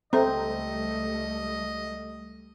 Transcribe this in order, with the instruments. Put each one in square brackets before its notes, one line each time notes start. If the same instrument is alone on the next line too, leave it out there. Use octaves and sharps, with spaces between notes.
[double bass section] C#2 G3 A3 [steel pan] C4 [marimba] A4 E5 A#5 [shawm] D#5